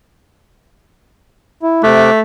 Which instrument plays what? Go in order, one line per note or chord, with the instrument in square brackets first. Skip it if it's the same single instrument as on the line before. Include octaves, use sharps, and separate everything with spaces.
[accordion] E4
[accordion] C3 D6 F#6 [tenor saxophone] A3